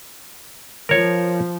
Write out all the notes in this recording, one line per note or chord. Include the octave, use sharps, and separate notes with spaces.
F3 A#4 C#5